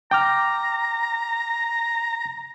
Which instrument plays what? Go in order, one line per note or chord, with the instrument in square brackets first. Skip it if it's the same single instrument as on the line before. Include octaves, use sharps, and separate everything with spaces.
[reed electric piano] G5 D6 F6 [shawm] A#5